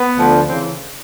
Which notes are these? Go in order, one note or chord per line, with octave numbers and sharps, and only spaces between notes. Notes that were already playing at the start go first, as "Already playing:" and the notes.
Already playing: B3
D2 D3 F3
C#3 E3 C4